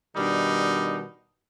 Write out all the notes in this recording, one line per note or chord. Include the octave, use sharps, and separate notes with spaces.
B2 D#3 G3 D4 D#4